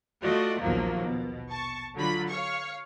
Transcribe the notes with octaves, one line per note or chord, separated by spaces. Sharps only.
A3 F4 F#4 D5 D#5
A#1 D#2 B2 F3 F#3 A#3
B2
A5 C#6
D3 F#3 F4 B5
C#5 F5 C#6